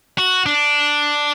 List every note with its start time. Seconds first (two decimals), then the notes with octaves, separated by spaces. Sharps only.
0.18 F#4
0.46 D4